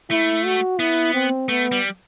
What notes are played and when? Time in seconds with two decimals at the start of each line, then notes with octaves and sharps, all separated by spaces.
0.10 A3 E4
0.45 F#4
0.79 B3 E4
1.14 C4
1.49 A3 B3
1.72 G3